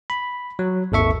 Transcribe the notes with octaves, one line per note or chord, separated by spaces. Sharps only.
B5
F#3
G#1 D#2 A4 E5 C#6